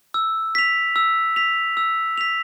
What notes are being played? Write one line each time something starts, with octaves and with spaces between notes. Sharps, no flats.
E6
B6 F7
E6
B6 F7
E6
B6 F7